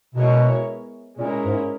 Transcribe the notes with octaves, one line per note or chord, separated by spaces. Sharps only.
B2 G#3 B3 E4 A#4 C#5
A#2 G#3 C#4 E4 A#4
G#2